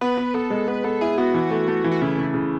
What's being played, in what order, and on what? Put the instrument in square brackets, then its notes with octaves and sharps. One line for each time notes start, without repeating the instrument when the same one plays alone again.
[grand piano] B3 [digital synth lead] B4
[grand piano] B3
[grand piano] B3 [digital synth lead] A4
[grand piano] G#3
[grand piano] B3 [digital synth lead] B4
[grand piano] B3 [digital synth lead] A4
[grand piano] E4 [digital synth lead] G#4
[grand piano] B3 [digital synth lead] F#4
[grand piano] E3
A3
A3
E3
[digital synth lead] F#4
[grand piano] C#3 [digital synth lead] E4
[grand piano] C#3
C#3